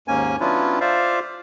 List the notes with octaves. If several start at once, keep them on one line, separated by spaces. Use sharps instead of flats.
D#2 G#2 A#3 C#4 G#5
F#3 B3 C#4 D4 E4 F4
F4 C5 D5 E5 F5